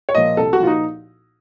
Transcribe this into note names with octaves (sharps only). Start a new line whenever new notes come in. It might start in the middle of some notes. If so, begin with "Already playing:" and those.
C#5
A#2 F3 D#5
C2 A4
F#4
A#2 F3 F4
D#4